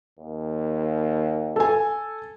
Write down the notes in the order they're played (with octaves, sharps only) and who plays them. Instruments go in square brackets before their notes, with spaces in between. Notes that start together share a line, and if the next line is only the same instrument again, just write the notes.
[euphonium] D#2
[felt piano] A4 G#5